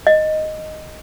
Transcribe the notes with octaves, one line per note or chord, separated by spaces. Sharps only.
D#5